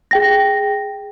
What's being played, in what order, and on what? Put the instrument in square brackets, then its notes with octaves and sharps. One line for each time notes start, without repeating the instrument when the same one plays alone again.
[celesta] G#4 G5 A#6